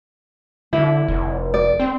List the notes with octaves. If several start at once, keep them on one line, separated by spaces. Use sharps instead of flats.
D3 E4
F1
D5
C4